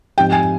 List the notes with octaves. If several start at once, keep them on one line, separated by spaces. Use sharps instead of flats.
G#2 F3 C4 D#4 G4 G5
G#5